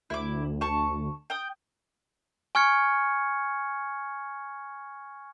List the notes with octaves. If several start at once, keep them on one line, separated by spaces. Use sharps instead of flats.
D2 E4 D6
A5 C#6
G5 D#6
G#5 C#6 F6 G#6 C#7